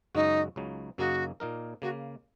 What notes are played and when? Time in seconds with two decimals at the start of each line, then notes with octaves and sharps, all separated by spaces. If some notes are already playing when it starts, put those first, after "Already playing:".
0.15 F#2 C#3 G#3 D#4 F#4
0.56 C#2 C#3 F#3 D#4
0.98 F#2 C#3 A#3 D#4 F#4 G#4
1.40 A#2 A#3 D#4 A#4
1.82 C#3 A#3 F#4